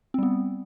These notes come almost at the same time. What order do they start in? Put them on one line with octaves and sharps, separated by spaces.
C4 G3 B3